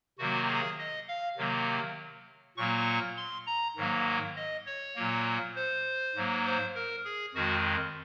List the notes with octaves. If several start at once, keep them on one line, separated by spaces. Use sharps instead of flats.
C3 D#3 F#3 A#3 F#4
G#4
D#5
F5
C3 D#3 F#3 A#3
A#2 F#3 A#3 C#6
C6
A#5
G#2 D#3 F#3 A#3
D#5
C#5
A#2 F#3 A#3
C5
G#2 F#3 A#3
C5
A#4
G#4
F2 D#3 G#3 F#4